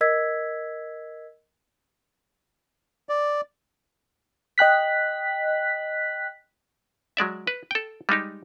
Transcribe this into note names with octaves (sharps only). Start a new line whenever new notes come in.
A#4 D#5 E6 G#6 B6
D5
D#5 G5 F#6 B6
F#3 G#3 D5 E5
B4
A4 G5
G3 G#3 D#4 G4